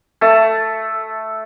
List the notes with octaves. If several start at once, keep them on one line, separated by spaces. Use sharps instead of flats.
A3 A5